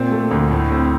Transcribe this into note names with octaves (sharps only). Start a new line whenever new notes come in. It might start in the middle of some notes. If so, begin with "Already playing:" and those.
Already playing: A#2 C4
A3
D2
A2
C4